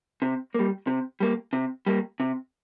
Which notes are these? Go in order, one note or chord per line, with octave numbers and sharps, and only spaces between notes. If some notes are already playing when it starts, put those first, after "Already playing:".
C3
G3 A#3
C3
G3 A#3
C3
G3 A#3
C3